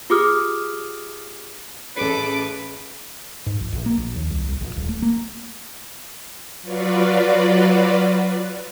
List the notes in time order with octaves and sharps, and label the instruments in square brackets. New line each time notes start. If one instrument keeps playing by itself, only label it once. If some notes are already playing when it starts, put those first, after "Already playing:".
[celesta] F4 G4 G#4 D6 D#6 F6
[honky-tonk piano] A1 C#4 [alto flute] G#4 [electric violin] A4 D6 [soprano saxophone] B4
[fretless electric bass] G#2
A#1
A#1
A#3
A#1
D#2
C2
C2
A#1
D#1
A3
A#3
[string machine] F#3 F4 F#4 B4 D5